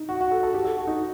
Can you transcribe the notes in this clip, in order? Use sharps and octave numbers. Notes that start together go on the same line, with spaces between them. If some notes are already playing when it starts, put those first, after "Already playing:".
Already playing: D#4
F#4
F#4
A4
A4
G4
A4
F#4
D#4